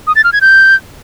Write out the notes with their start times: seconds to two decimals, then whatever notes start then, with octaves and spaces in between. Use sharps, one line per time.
0.07 D#6
0.16 A6
0.24 F6
0.33 G#6
0.41 G6